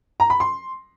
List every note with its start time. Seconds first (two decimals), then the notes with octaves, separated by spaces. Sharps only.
0.20 A#5
0.30 B5
0.40 C6